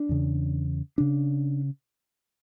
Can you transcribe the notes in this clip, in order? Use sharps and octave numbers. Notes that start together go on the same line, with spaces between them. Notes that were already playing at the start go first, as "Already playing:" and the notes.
Already playing: D4
E2 C#3
C#3 D4